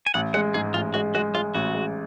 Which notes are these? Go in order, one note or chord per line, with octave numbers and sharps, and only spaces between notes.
G#5
A1 F#5
G#3 F#5
G#2 G#4
A1 F4
G#3 F#4
G#3 F#4
G#3 F4
A1 F#4
G#3